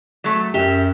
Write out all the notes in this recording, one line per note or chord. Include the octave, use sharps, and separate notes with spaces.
F#3 A3
F#2 G4 E5